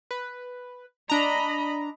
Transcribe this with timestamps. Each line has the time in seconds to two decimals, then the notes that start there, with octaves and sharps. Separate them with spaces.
0.11 B4
1.10 D4 D#5 A#5 B5